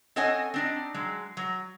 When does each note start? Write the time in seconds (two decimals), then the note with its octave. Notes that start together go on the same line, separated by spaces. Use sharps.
0.16 C4 A4 C#5 D#5 F#5 G#5
0.54 C4 D4 D#4
0.94 F#3 G#3
1.37 F#3